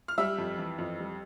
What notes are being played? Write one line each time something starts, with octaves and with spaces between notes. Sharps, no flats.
F6
G3 E5 E6
F2
E3
F2
G3